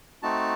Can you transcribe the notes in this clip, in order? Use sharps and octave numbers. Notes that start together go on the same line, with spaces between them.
A3 C4 D#4 F#4 A5